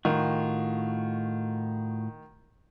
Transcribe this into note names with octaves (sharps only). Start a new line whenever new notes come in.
A2 D#3 F4 F#4